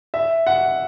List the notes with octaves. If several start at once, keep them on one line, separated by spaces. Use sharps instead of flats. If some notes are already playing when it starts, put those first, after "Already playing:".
E5
F#5